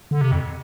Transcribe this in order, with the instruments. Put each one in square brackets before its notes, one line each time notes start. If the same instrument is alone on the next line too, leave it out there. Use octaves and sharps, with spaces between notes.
[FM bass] D3
C3
F2